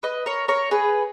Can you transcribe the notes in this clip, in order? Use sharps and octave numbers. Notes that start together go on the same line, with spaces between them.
B4 D#5
A#4 C#5
A#4 C#5
G#4 B4